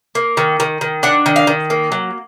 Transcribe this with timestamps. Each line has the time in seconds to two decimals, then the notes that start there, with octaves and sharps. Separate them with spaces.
0.15 A#3
0.37 D#3
0.60 D#3
0.81 D#3
1.03 D4 F#5
1.26 D#3
1.36 F5
1.47 D#3
1.70 A#3
1.92 F#3